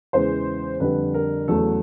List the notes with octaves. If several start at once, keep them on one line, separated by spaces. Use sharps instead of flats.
E2 C#3 E3 G#3 C5
F2 D3 G3 B4
A#4
E2 C#3 F#3 A3 A4